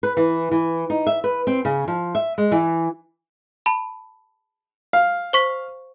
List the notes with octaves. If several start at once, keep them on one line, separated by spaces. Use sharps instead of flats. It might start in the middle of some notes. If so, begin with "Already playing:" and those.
B4
E3
E3
D#4
E5
B4
C4
C#3
F3
E5
G#3
E3
A5 B5
F5
C5 C#6 B6